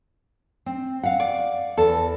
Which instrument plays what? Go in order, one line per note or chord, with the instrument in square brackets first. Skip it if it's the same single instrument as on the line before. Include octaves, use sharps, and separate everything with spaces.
[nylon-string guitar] C4
F5 F#5
[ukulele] D5
[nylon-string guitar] E2 [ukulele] A4